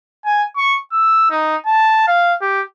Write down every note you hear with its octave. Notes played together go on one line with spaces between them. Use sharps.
G#5
C#6
E6
D#4
A5
F5
G4